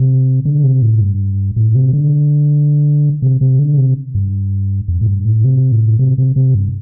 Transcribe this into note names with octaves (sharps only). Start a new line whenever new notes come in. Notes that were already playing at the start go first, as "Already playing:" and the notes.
Already playing: C3
D3
C3
A2
G2
A2
C3
D3
C3
C3
D3
C3
G2
F2
A2
G2
A2
C3
A2
C3
C3
C3
G2